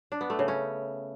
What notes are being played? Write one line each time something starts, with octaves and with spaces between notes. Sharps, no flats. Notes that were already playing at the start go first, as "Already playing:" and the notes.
D4
B3
A3
C#3
C#4